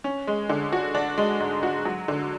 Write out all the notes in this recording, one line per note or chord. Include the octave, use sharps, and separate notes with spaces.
C#4
G#3
D3
F#4
D4
G#3
G#2
F#4
F#3
D3